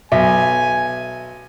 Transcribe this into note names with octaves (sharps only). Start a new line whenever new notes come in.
B1 E5 G#5